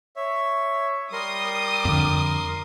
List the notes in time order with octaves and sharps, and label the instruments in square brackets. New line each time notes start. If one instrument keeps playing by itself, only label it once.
[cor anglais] C#5 [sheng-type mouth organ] E5
[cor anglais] G3 [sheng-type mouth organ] A#4 C6 [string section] D#6
[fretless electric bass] F2 D3